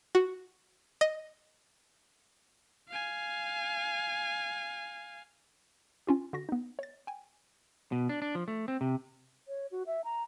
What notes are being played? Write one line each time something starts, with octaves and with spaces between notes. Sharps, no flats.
F#4
D#5
F5 G#5
C#4 F4 G4
D3 F#4 A#6
B3 D#4
C#5 A6
G5 G#5
B2
D4
D4
F3
A3
C4
C3
C#5
F#4
E5
A#5